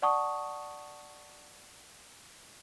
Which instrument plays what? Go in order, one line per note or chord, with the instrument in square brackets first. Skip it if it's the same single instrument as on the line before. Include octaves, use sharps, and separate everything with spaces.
[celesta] D5 F#5 A5 C#6 D#6